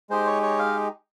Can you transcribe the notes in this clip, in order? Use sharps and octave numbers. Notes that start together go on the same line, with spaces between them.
G#3 D#4 G4 C5
C#5
C#5
F5